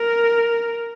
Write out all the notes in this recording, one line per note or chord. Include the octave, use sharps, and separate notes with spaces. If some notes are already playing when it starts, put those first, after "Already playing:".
Already playing: A#4